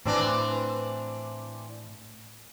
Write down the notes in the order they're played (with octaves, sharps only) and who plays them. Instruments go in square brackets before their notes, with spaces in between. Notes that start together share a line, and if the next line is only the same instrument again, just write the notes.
[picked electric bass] A2 [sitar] E3 C4 D4